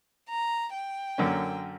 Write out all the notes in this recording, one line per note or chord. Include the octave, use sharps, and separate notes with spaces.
A#5
G5
F#2 D3 A#3 C#4